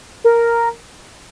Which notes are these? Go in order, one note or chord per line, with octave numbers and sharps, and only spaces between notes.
A#4